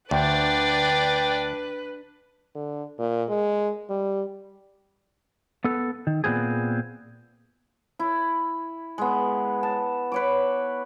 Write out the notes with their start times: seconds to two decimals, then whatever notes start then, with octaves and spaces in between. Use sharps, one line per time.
0.11 D2 D4 B4 D5 G5
2.55 D3
2.99 A#2
3.29 G#3
3.90 G3
5.64 B3 A4
6.07 D#3
6.24 A#2 C#3 B3 C4 G#4
7.99 E4
8.98 G#3 B3
9.63 A5
10.12 B4 C#5 D6